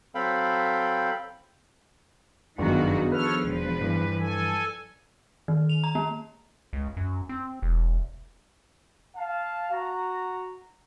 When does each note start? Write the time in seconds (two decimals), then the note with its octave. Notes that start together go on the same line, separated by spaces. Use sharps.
0.15 F#3 C4 A4 F5 G5 B5
2.58 G1 F#2 D#3 B3 D4 F#4 G#4
3.12 F3 A4 B4 C#5 E6 F6
3.44 E1 B4
3.81 G2 E3
4.19 A4 G#5
5.48 D#3
5.70 F7
5.84 A#5
5.95 A#3
6.73 C#2
6.97 F#2
7.29 C4
7.62 E1
9.16 F5 A5
9.72 F#4 A#5